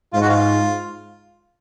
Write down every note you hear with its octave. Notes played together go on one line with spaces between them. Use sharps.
G#2 F4
F#4
F4